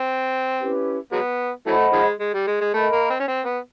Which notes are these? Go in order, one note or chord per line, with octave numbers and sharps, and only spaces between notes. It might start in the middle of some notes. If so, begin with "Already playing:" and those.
Already playing: C4
C#4 E4 G4 B4
F#3 G#3 B3
E3 F#3 A3 C5 D#5 F#5 B5
D#3 F3 G#3
G#3
G3
G#3
G#3
A3 A#4 D#5 G5 B5
A#3
C4
C#4
C4
B3